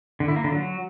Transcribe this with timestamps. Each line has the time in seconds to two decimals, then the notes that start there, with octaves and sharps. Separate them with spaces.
0.20 D3
0.28 E4
0.36 A#3
0.44 D3
0.52 F#3